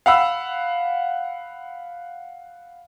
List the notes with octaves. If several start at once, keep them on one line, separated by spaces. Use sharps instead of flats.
F5 F#5 B5 E6